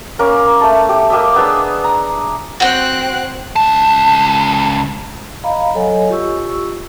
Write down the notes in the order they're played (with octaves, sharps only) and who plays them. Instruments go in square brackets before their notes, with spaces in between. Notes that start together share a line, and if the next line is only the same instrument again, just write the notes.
[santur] A#3 C#4 A#4
A3 A5
G4
A#3 G4 D#5 E5
B3 D4 G#4 E6
A#5
[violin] C4 F#6 [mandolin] F#4 G5
[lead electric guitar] C#2 A5
[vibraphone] D#5 F5 A#5 B5
F#3 A4 C#5 D#5 G#5
F4 G4 C#6 E6